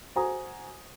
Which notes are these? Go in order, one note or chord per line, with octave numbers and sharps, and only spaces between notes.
F#4 C5 G#5 A#5 D#6